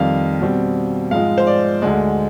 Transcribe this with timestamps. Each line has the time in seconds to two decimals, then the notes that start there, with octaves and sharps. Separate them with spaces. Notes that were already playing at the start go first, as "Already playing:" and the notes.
Already playing: F2 D#3 G3 F5
0.41 B2 G3 C4
1.11 G#2 F3 G#3 F5
1.38 C5
1.47 D5
1.82 D2 D3 G#3